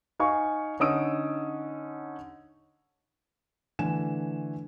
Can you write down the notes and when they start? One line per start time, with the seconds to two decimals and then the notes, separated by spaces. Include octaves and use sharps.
0.19 D#4 F5 G#5 C#6
0.80 D3 C#4 D#4 D#6 E6 D7
3.79 D3 E3 A3 G#5 E7